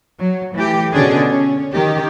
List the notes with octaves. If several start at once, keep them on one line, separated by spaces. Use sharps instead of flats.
F#3
E3 A3 G4
B2 D3 C#4 D4 G#4
C#4
D#3 G4